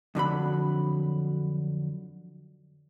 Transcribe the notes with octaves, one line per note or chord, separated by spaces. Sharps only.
F2 D3 F#3 B5